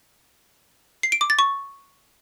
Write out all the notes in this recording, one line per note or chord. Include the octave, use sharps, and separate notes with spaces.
C7
D7
D6
A6
C#6